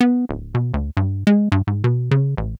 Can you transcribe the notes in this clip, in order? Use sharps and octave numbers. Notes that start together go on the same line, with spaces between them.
B3
D1
B2
D2
G2
G#3
G2
G#2
B2
C#3
A1